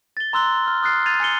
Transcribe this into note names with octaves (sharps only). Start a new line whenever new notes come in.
A6 G7
A#5 C6 E6 F#6 G7
F6
D#6 F6 F#6 A6 C7
G#6 A6 D#7 F7
G#5 C7 C#7 G7